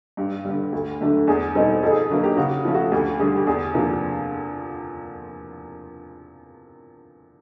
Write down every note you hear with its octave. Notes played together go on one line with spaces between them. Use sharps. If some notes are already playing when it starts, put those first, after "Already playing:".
G2 G4
D3 G3
D2
D3 F#3 A3 D4
E2 G#4
B2 G3 C4 D#4 A4
F2 A4
G#4
A4
D3 F#3 A#3
G4
C#3 F#4
F3 A3 C#4
F#4
D2 G4
D3 G3 G#4
G4
E2 G#4
C3 F3 A#3 D4